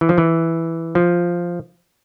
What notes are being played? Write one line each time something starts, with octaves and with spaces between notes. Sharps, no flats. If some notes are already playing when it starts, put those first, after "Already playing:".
E3
F3
E3
F3